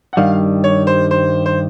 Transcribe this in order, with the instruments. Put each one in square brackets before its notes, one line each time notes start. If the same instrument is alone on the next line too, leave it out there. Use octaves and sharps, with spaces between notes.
[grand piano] F#5
[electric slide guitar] G2 D#3 G3 [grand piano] F5
[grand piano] C#5
C5
C5
C5